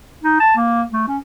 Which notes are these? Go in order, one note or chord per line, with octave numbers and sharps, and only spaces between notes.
D#4
A5
A#3
A3
C#4